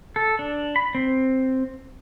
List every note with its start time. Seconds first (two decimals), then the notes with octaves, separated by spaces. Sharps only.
0.16 A4
0.39 D4
0.76 B5
0.95 C4